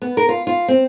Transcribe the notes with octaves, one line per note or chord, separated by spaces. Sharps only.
B3
A#4
F4
F4
C4